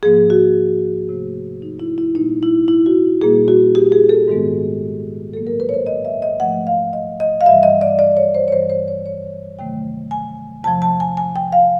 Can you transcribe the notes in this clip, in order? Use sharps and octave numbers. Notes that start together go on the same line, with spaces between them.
G#2 F3 A#3 G#4
F#4
C3 F3 A3
D#4
E4
E4
A#2 G3 A#3 D#4
E4
E4
F#4
A#2 G3 A#3 G#4
F#4
G4
G#4
A4
G#2 D#3 G#3 B3
A2 F#3 A#3 A4
A#4
B4
C#5
C5
D#5
E5
D#5
G#2 F3 A3 F#5
F5
D#5
D#5
F5
G2 E3 G3 E5
D#5
D5
D5
C#5
C5
C#5
G2 E3 G3 C5
C5
C#5
C#5
E2 C3 D#3 F#3 A3 G5
G#5
E2 C3 F3 A5
A5
G#5
G#5
G5
F5